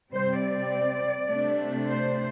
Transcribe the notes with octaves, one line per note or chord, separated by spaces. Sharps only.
C3 G3 C4 C5
D5
C3 A3 D4
C5